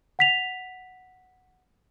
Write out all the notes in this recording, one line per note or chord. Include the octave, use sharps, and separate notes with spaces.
F#5 B6 F7